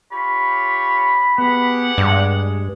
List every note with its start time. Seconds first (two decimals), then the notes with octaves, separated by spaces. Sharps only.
0.12 F4 G4 C#5 B5
1.38 B3 G4 G#4 F#5
1.98 G2 G#3 D5